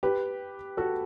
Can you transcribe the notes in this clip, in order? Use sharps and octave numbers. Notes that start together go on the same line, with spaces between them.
G4 B4
F#4 A4